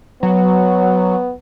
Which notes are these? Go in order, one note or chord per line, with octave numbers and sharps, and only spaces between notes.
F#3 B3